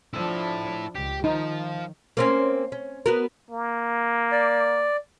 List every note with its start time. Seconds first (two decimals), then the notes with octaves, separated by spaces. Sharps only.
0.14 F3 D4 E4 A4
0.95 C#2 G4
1.24 D#3 F3 D#4
2.17 A#3 C4 C#4
2.72 C#4
3.06 B3 F#4 A#4
3.50 A#3
4.32 D5